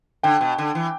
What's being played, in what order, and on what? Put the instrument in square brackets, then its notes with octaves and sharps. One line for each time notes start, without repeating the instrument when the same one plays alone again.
[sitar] D3 [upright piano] G5
[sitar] B2
D3
E3